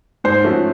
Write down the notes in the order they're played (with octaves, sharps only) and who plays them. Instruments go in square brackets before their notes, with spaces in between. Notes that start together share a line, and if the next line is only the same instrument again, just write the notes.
[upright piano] G#2 [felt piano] C5
[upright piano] F3 A3 C#4 F#4